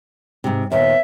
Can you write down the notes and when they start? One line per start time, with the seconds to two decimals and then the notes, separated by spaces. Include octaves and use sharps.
0.44 G#2 C3
0.72 D#2 A#2 B3 E5